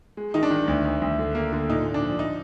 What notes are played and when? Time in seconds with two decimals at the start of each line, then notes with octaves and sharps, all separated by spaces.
0.17 G#3
0.34 D#3 D#4
0.43 D4
0.50 D#3
0.68 D2
0.85 D2
1.01 D2
1.19 D3
1.35 A#3
1.53 D3
1.69 A#2 D#4
1.86 A#2
1.94 D4
2.03 F3
2.19 D#4